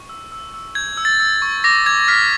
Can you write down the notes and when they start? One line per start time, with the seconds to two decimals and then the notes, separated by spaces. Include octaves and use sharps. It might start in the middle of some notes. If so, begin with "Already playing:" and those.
Already playing: C#6
0.09 E6
0.32 E6
0.54 E6
0.75 G6 G#6
0.97 E6
1.05 A6
1.20 E6
1.42 C#6
1.64 D6 A#6
1.86 D6 G#6
2.08 F6 B6